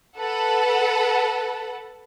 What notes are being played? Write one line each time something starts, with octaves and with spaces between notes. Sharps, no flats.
A4 B4 F#5